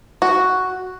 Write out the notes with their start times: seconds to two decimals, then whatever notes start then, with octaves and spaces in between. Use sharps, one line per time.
0.22 F#4